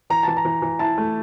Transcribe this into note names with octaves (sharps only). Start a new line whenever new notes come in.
E3 A#5
E3 A5
A#5
E3
E3
E4 A5
A3